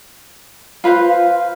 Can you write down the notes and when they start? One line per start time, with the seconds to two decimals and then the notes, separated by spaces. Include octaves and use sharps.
0.84 F4 B4 C5 F5